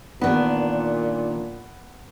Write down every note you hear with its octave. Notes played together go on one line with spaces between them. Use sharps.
A#2 D#3 B3 D4